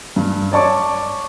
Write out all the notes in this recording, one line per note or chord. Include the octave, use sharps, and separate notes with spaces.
G2
C#5 D5 A5 C#6 D6